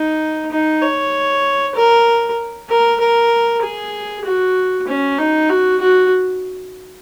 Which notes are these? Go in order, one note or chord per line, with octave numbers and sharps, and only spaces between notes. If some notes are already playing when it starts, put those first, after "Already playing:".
Already playing: D#4
D#4
C#5
A#4
A#4
A#4
G#4
F#4
C#4
D#4
F#4
F#4